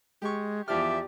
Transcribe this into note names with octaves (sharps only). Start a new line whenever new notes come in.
G#3 G4 C#6
E2 F3 G4 D5 E5 F6